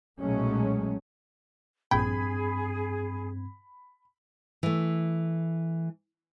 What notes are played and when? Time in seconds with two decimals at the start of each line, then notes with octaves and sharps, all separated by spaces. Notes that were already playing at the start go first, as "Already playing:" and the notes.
0.21 B1 A#2 F#3 G#3 A3 C#4
1.91 A#1 G2 C4 G#4 G5 B5 G#6
4.63 E3 A3